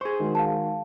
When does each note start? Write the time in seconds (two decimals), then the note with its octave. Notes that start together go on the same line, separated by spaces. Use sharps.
0.01 G#4 C5 C#6
0.19 D#3 G#3 F#4
0.35 F5 A5